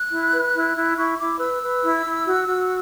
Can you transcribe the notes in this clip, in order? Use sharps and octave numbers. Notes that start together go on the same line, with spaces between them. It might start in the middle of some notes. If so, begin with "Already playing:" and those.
Already playing: F#6
E4
B4
E4
E4
E4 C#6
E4 D6
B4 E6
B4
E4
E4
F#4
F#4